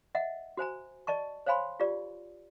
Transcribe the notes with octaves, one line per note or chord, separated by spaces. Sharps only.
D#5 E5 F#5
F#4 C5 G#5 A#5
D5 D#5 A5 C#6
C5 C#5 F5 G#5 B5 C6
F4 G4 D5